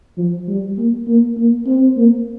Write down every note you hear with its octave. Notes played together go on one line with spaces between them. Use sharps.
F3
G3
A#3
A#3
A#3
C4
A#3